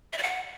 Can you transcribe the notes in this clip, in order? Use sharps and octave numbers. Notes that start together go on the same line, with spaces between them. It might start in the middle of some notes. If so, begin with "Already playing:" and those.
E5
D5
F#5